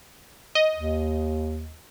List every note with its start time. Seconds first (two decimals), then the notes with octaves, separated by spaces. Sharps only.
0.55 D#5
0.74 D#2